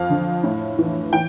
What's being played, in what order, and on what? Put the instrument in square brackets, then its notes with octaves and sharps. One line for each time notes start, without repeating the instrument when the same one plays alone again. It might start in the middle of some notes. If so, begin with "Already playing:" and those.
Already playing: [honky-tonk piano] F2 F5
D3
A2
E3
E3 G5